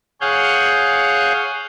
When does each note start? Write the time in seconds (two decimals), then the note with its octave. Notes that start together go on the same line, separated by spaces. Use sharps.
0.21 G#4 C#5 F5 F#5 G6